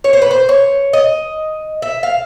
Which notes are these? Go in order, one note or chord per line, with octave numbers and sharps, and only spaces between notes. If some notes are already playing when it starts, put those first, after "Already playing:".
C#5
C5
B4
C5
C#5
D#5
E5
F5